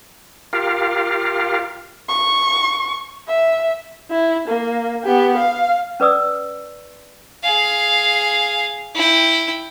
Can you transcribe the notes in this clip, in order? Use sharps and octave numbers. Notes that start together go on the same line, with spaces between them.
F4 G4 A#4 F5
C#6
E5
E4
A#3
B3 G4
F5
C#4 B4 D5 D#6 E6
G#4 F5
E4 G5